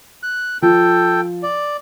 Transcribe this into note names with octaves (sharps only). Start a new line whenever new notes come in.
F#6
F3 A4 G5
D5